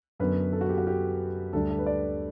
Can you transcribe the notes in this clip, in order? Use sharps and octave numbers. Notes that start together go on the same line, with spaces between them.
F#2 D3 F#3 B3 B4
A4
F#4
G4
F#4
G4
D2 D3 G3 D4 A4
A4
B4
D5